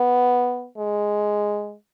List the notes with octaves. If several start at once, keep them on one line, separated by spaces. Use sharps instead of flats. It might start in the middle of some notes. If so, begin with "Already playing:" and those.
Already playing: B3
G#3